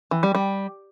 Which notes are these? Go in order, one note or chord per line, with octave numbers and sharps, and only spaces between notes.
E3
G3
G3